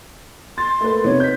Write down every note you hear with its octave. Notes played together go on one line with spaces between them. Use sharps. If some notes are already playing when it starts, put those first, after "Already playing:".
C6 A6
A3 A#3 B4
C3 B3 D#4 C#5
G6 B6